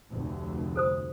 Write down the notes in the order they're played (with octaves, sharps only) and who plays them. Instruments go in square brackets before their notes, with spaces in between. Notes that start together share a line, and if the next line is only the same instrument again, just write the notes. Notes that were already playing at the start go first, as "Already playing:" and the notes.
[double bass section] F1 D2
[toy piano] A4 C5 D#6